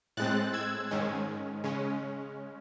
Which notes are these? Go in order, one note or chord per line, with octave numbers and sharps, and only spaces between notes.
A2 G#3 C4 F#6 A6
E6 G#6
G#2 D#3 G#3 C#4
C#3 G#3 C#4